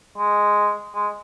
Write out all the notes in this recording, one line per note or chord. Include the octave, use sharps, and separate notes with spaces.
G#3
G#3